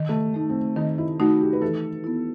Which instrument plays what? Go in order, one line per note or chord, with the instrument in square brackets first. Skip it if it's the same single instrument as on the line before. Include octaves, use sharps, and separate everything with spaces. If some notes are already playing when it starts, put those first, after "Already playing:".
Already playing: [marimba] D#3
[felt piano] A3
[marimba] A3 D#4
[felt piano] C4
[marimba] D#3 [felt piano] D#4
[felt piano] E4
[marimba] A3 D#4 [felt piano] F#4
[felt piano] G4
B4
[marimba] E3 [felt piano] A4
[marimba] B3 E4